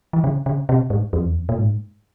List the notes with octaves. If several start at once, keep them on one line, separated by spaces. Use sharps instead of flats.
E3
C#3
C#3
C3
G#2
F2
E2
F2
A#2
G#2